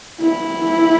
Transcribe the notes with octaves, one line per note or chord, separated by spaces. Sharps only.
E4